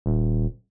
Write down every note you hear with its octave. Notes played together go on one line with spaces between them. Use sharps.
D#1